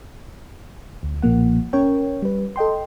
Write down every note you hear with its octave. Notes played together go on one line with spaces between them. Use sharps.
D2
B1 A#2 F3 A#3 F#5
C#4 A#4 C#5 G5
G3 B4
A4 D#5 G5 C6